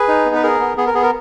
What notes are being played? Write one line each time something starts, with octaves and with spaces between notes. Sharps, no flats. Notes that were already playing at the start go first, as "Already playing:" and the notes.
Already playing: G#4 B4
D#4
B3
B4
G#4 A#4
B3
B3 G#4
A#4
B3 G#4
A#4